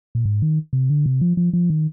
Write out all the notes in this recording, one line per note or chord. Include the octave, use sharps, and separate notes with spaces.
A#2
G#2
D#3
C3
D3
C3
F3
F3
F3
D#3